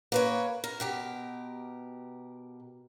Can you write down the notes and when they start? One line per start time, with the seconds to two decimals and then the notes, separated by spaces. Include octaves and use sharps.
0.12 A#3 B4 C#5
0.64 A#4
0.80 B2 G4 A#4